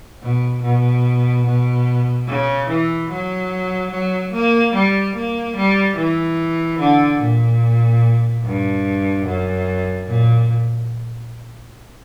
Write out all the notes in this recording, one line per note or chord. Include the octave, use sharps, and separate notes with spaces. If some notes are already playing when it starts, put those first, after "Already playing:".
B2
B2
B2
C#3
E3
F#3
F#3
A#3
G3
A#3
G3
E3
D3
A#2
G2
F#2
A#2